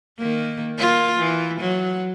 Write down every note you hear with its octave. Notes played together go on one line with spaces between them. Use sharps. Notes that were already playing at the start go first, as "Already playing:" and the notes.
D#3 A#3
A#3 F4
E3
F#3